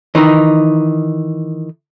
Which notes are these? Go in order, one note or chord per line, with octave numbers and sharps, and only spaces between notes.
D#3 E3 D#4